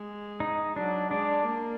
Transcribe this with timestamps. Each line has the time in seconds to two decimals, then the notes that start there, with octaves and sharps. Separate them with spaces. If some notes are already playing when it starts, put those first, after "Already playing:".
Already playing: G#3
0.40 D#4
0.76 F#3 D4
1.11 G#3 D4
1.47 A#3